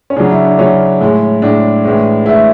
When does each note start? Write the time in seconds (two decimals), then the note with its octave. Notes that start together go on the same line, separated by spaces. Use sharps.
0.10 C#4
0.16 C#3 F#3 D4
0.31 E4
0.45 D4
0.59 C#3 F#3 C#4
1.00 A2 G#3
1.42 A2 G#3 D4
1.84 A2 E3 G#3
2.26 A2 E3 G#3 E4